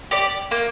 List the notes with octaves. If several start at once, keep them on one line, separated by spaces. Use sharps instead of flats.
G4 D5
A#3